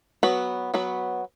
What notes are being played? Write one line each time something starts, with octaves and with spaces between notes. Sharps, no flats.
F#3 B3 F#4 B4
F#3 B3 F#4 B4